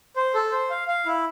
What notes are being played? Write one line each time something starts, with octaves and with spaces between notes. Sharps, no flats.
C5
A4
C5
F5
F5
E4